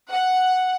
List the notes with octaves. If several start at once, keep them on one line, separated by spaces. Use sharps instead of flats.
F#5